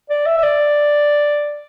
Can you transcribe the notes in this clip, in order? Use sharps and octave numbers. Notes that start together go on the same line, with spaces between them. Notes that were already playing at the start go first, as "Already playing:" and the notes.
D5
E5
E5
D5